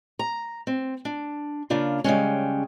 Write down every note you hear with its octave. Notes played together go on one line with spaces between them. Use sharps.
A#5
C4
D4
C#3 A#3 D4 F4
C#3 G3 G#3 C#4